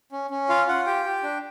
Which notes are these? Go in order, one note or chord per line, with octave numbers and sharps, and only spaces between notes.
C#4
C#4
F4 F5
F4 F#5
G4 G5
G4
D4